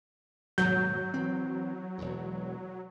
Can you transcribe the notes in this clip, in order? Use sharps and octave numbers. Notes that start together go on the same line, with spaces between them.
D#1 G#2 B2 F#3 G6
E3 C4
E1 E2